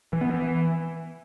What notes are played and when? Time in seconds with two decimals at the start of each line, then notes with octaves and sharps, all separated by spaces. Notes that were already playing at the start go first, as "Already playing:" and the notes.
0.13 E3
0.21 B3
0.30 E3